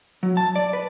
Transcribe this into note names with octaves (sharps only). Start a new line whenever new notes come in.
F#3
A5
D5
B4